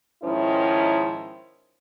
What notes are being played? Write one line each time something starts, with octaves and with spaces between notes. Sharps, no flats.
G#2 D#3 F3 C#4 E4